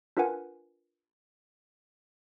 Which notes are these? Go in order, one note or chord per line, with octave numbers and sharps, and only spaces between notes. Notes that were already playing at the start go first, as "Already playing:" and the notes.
D4 F4 A#4 B4 F#5 G#5